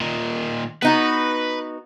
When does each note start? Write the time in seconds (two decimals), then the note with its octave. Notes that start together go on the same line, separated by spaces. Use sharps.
0.01 A#2 D#3
0.82 B3 D#4 F#4 B4